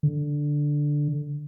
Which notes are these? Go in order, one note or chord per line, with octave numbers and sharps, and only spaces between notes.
D3